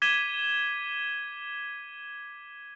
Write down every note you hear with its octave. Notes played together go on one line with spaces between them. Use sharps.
D6 G#6 B6 D#7 E7 G7